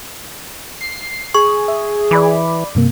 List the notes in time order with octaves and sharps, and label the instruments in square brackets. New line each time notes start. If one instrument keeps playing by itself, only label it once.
[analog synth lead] C7
[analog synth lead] G#4 [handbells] C#6
[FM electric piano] E5
[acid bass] E3 [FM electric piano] D5 B5 D6
[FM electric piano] G2 C3 A#3